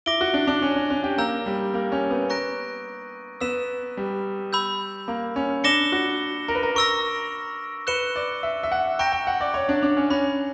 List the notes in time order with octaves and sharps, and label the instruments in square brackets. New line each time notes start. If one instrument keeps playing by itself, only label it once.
[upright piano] E4 [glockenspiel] D6 A#6 D7 G7
[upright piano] F#4
D4
D4
C#4
C#4
C#4
G4
[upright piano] A#3 [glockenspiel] A#5 E6 G6
[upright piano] G3
A#3
C#4
B3
[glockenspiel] A#5 C#6 F#6 A#6 D7
[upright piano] B3 [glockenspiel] E6 B6 E7
[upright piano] G3
[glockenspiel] B5 E6 G6
[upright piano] A#3
C#4
[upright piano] D4 [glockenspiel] D6 A#6 C#7 E7 G7
[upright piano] F#4
A#4
B4
A#4
[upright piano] A#4 [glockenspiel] C#6 E6 A#6
[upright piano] B4 [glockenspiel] F#6 C#7 E7 G7
[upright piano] D5
E5
E5
F#5
[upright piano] G5 [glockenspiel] A#5 C#6 F#6 A#6 E7
[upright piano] G5
F#5
D5
C#5
D4
D4
C#4
[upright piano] C#4 [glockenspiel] B5 F#6 A#6